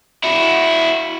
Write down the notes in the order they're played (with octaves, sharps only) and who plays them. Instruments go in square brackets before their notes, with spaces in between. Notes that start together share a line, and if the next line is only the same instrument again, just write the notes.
[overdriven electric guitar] E4 F#4